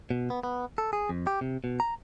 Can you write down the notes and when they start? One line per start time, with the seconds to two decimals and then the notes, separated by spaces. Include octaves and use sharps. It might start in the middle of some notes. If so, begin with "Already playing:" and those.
0.11 B2
0.30 B3
0.43 B3
0.78 A4
0.93 G#4
1.09 F2
1.27 G4
1.41 C3
1.64 B2
1.80 A#5